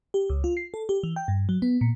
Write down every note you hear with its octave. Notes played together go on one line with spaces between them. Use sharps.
G4
C#2
F4
C7
A4
G4
E3
G5
G2
F#3
B3
A#2